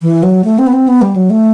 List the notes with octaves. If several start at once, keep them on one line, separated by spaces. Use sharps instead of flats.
E3
F#3
A3
C4
B3
C4
B3
G3
F#3
A3